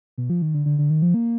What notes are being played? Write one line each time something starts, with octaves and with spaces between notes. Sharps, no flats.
B2
F3
D#3
D3
D3
D3
D#3
F3
A#3